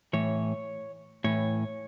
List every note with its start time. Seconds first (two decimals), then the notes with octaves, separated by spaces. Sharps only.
0.13 A2 E3 C#5
1.24 A2 E3 C#5